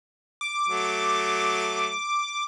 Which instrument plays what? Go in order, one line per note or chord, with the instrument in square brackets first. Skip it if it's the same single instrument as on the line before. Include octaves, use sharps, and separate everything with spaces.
[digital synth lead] D6
[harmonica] F#3 A3